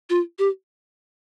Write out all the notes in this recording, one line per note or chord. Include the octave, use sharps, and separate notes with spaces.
F4
G4